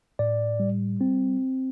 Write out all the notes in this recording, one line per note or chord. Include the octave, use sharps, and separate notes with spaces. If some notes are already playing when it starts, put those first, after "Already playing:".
A2 D5
G3
C4